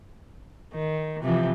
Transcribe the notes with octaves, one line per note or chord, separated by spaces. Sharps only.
D#3
C3 E3 F3